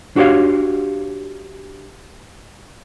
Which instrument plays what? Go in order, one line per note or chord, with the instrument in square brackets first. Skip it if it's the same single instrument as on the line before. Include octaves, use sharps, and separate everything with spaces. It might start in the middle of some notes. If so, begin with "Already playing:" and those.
[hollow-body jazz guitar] D4 F#4 G4 C#5 F5